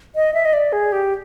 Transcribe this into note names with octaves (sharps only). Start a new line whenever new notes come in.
D#5
E5
D#5
D5
G#4
G4